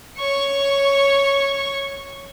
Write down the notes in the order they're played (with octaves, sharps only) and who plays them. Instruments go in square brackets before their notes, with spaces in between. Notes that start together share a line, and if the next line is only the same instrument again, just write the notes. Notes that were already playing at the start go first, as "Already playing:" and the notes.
[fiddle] C#5 C#6